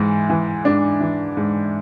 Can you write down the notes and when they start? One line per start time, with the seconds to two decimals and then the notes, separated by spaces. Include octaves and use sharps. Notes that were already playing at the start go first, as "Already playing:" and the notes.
Already playing: G#2 E3
0.29 E3
0.65 G#2 D4
1.01 E3
1.37 G#2